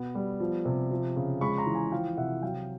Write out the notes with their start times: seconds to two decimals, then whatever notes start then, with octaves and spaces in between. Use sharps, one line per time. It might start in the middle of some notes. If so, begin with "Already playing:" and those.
Already playing: B2 B3
0.15 G3
0.40 F3
0.65 C3
0.91 F3
1.16 C#3
1.41 G#3 B5 C#6
1.58 A#5 C6
1.66 E3
1.75 G#5 A#5
1.92 F3 F5 G5
2.17 C3 E5 F#5
2.43 F#3 F5 G5